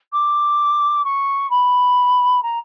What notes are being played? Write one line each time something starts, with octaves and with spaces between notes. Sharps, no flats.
D6
C#6
B5
A#5